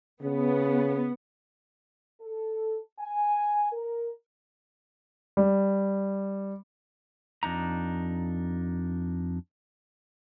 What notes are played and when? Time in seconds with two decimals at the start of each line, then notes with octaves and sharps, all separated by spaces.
0.22 C#3 B3
2.21 A4
2.99 G#5
3.72 A#4
5.37 G3
7.43 F2 D4 D#4 A#5